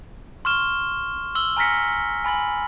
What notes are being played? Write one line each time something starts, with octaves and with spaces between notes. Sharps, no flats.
C6 C#6 F6 E7 G7
C6 E6 F#7 G7
G#5 A#5 F6 A#6 B6 C#7
G#5 B5 A6 F#7